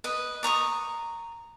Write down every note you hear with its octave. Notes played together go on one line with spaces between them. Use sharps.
B4 D#5
D5 A#5 C#6 D#6